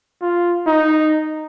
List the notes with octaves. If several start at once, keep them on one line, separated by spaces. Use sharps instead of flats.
F4
D#4